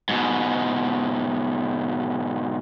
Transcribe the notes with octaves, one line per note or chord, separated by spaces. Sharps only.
G#2 B2